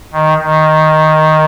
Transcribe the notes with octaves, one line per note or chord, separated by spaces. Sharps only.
D#3
D#3